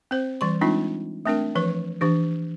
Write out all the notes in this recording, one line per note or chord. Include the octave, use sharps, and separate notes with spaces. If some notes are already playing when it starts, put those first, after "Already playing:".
C4 C5
E3 G3 C6
G#3 C4 D4 D#4 F4
A3 C4 D4 A#4 G5
E3 F3 B4 C#5
E3 D4 G4